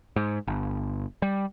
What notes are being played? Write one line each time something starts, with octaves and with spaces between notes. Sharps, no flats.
G#2
G1
G3